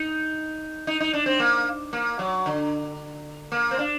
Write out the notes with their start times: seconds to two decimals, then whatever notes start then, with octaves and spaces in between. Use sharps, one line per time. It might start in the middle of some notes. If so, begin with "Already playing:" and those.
Already playing: D#4
0.87 D#4
1.00 D#4
1.14 D4
1.26 C4
1.40 A#3
1.93 A#3
2.19 F#3
2.46 D3
3.52 A#3
3.71 C4
3.79 D4